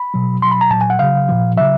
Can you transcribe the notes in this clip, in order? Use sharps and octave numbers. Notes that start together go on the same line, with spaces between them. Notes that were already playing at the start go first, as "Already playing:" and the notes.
Already playing: B5
B2 F#3
B2 F#3 C6
B5
A#5
A#2 F#3 A5
G#5
F#5
C#3 F#3 F5
A#2 F3
C#3 F#3 E5